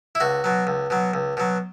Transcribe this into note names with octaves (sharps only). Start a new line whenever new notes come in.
E4
C#2 F#4
B2 F#3
C#2
B2 F#3
C#2
B2 F#3